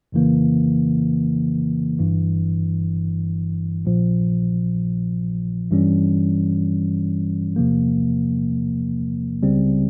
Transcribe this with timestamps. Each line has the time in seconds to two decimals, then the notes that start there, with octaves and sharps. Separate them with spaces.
0.12 F2 C#3 E3 A#3
1.98 G1 G2 E3
3.85 A#1 A#2 F3
5.71 G2 E3 G3 C#4
7.56 E2 C3 F3 A#3
9.43 C#2 C#3 G3 C4